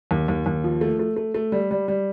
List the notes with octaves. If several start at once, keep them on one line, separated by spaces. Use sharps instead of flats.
D#2
D#2
D#2
F3
A3
A3
A3
A3
G3
G3
G3